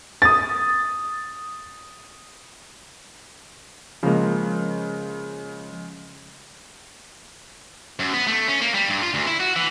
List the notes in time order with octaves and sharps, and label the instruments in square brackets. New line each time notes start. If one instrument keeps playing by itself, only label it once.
[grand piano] D#6 A6
[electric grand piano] C#3 G#3 [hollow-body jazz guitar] F3 A#3
[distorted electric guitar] F#2
B3
A3
C#4
A#3
G3
G2
F4
D2
E4
F#4
E3